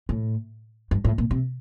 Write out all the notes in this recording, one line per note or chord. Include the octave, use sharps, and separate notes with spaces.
A2
G2
A2
A#2
C3